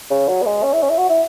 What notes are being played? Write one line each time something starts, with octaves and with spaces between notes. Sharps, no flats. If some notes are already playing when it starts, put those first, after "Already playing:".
C#3
F#3
B3
G#3
C#4
E4
C#4
E4
F#4
E4